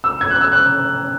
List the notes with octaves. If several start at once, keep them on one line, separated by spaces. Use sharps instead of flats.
E6
G#6
F#6
E6
F#6